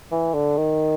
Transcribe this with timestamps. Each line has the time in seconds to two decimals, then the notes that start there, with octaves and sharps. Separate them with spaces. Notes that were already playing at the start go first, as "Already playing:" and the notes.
0.11 E3
0.34 D3
0.57 D#3